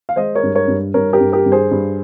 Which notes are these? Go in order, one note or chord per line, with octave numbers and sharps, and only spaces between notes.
F5
G#3 C5 D#5
A#4 C#5
G2
A#4 C#5
G2
G2 A#4 C#5
G4 A#4
G2
G4 A#4
G2
G#4 C5
G2